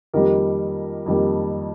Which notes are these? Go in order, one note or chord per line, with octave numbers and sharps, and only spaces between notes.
F2 D#3 G3 A#3 G4 A#4
F2 D#3 G3 A#3